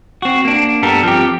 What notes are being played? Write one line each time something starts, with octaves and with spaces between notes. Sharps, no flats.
C4 F#4
A#3 D4
G2 G3 B3 A4 A#4
F3 C4 G4